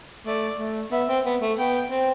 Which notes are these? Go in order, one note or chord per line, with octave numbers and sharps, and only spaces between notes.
A3 D5
A3
B3 E5
C4
B3
A3
B3 G5
C4